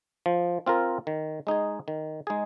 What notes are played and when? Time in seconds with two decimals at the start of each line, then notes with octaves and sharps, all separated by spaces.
0.26 F3
0.66 C4 F4 A#4
1.07 D#3
1.47 G#3 D#4 G#4
1.88 D#3
2.27 G#3 D#4 G#4